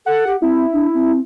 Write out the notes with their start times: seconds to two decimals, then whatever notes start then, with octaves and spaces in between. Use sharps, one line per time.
0.06 A4 F#5
0.27 G4
0.42 C4 E4
0.72 D4
0.94 C4